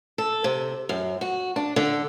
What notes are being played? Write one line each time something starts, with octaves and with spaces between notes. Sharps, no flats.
A4
C3
F#2
F#4
D4
D3